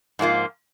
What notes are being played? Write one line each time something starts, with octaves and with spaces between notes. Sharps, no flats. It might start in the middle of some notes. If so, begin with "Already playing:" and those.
G#2 F3 A#3 F4